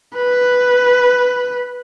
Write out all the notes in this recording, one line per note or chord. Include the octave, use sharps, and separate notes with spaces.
B4